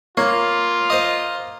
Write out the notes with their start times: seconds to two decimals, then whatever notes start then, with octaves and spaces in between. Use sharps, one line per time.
0.17 A#3 F4 C#5
0.90 C5 D#5